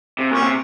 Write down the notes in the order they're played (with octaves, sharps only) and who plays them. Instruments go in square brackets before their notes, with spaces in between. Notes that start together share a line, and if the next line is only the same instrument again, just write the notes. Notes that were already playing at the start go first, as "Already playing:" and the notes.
[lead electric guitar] C3
[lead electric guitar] A#2 [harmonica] C#4
[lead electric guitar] C3